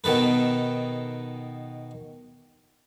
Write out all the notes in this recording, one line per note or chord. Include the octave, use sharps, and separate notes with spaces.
B2 D#3 A4 B4